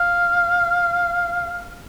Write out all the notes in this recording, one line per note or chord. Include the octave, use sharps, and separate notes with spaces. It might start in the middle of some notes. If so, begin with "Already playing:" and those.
Already playing: F5